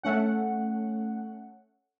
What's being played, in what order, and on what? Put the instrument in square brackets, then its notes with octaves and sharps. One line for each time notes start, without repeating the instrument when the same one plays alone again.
[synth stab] A3 C#4 F#5